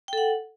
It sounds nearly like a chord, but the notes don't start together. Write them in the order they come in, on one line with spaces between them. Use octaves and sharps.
G5 A4 F#5